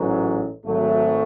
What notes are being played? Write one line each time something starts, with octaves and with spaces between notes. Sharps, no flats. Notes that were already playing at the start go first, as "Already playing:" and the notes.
Already playing: A1 G#2 F#3
G#1 G#2 F#3 A3